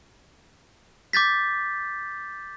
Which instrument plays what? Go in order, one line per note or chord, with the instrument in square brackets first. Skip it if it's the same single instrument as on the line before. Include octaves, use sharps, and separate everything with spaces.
[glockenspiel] D6 G6 A6 B6